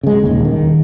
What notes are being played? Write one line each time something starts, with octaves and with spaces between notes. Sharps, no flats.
C#3 G#3
D#1 G#1 D#2
D#3